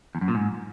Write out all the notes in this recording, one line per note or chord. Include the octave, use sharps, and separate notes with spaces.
E2
F#2
A#2
G#2